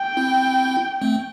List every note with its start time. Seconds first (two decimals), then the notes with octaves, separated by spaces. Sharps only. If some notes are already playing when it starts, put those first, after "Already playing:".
Already playing: G5
0.17 C4 E4
1.01 A3 C4